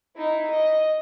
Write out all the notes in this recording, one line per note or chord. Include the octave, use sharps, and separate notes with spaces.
D#4 E4
D#5